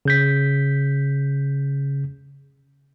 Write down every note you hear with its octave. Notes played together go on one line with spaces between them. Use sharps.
C#3 G6 B6